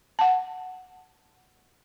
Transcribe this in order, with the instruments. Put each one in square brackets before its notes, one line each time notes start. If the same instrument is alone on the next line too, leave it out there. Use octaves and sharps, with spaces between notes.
[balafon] F#5 A5